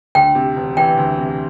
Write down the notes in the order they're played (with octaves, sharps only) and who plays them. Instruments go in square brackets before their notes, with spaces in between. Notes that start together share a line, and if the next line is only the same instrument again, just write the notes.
[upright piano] D2 [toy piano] G5
[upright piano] C3
E1
[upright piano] E3 [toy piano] G5
[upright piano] D2
C3